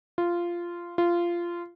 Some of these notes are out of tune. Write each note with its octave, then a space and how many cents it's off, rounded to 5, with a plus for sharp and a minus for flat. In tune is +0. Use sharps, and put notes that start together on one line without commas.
F4 -10
F4 -15